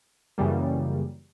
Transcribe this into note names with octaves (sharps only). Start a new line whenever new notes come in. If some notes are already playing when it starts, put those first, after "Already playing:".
F#2 C#3 E3 G3 A#3